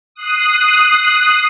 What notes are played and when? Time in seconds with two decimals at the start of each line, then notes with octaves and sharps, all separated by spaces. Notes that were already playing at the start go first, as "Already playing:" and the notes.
0.15 D#6 F#6 C7